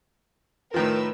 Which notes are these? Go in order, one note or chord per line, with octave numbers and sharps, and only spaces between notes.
A2 D#3 F3 A#4 B4 E6